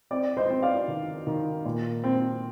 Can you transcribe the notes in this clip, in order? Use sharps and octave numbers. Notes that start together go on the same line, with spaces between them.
C4 D5
C5 D#5
C4
D5 F5
D#3
D#3
A#2
C4